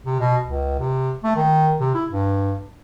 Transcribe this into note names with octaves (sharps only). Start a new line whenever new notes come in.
C3
B2
C#2
C3
A3
D#3
C3
E4
G2